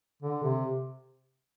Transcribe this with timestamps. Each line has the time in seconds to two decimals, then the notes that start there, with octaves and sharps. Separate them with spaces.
0.22 D3
0.43 C3